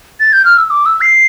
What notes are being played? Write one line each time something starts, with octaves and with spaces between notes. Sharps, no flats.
A6
G6
F6
E6
D6
E6
C7